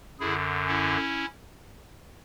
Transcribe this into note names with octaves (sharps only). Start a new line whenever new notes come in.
F#2 D3 E4 G#4
C#4 E4